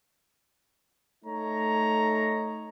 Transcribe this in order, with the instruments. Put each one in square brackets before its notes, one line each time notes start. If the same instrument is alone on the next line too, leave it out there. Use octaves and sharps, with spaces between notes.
[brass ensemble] A3 D#4 C#5 A#5